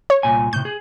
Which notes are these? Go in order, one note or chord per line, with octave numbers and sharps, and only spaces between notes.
C#5
C2 A#2 G#5
A2 C3 G6
G#4